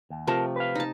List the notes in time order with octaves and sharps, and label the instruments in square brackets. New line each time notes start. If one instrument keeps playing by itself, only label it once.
[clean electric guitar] D#2
[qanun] C3 F3 A3 [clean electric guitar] A#4 A5
[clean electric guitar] B4 F5
[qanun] D#4 A5